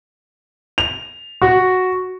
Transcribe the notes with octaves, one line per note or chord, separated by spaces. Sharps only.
F7
F#4